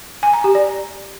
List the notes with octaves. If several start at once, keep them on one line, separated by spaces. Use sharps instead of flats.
G#5
A#5
G4
D5